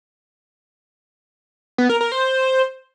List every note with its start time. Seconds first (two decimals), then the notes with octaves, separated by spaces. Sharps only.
1.78 B3
1.89 A#4
2.01 A#4
2.12 C5